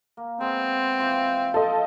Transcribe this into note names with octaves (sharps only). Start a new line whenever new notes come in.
A#3
G#3 B3 C4
E3 F4 C5
F3 A4 D#5